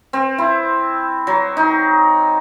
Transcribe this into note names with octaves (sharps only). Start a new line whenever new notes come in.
C4
E4
F#3
D#4